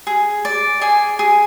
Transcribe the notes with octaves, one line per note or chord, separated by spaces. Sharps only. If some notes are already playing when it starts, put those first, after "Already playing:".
G#4
D5
G#4 G#5
G#4